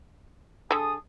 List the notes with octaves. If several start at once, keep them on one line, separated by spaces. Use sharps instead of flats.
D3 G#4 A4 A5 D#6